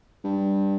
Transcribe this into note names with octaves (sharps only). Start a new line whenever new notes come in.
G2